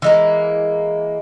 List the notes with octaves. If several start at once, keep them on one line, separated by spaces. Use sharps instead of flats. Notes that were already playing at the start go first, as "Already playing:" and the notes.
E3 G#3 A#3